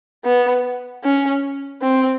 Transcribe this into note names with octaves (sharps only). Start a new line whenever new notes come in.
B3
C#4
C4